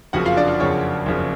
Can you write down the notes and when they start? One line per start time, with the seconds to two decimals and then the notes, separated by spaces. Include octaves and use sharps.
0.13 F#1 F2 C#3 F#4 F#5
0.25 F4 F5
0.37 D4 D5
0.48 F4 F5
0.60 F#1 F2 C#3 C#5
1.06 F#1 F2 C#3